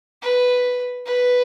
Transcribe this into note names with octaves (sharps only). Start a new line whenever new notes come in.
B4
B4